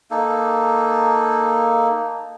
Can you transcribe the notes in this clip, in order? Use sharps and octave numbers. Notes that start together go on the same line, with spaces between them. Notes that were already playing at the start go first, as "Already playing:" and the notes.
A#3 D#4 A4